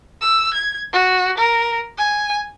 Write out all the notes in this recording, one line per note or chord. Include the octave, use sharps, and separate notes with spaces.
E6
G#6
F#4
A#4
G#5